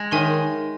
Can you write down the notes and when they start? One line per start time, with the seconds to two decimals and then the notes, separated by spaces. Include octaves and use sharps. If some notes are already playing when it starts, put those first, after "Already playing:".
Already playing: G#3
0.11 D#3 C#5 E5 G#5 C6